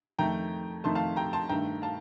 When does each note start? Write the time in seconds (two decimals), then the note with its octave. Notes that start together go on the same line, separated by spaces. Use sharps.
0.19 F2 D#3 A3 G5 A#5
0.84 F2 D#3 A3 A5 C6
0.95 F5 A5
1.16 G5 A#5
1.33 A5 C6
1.49 G2 D#3 A3 G5 A#5
1.82 F5 A5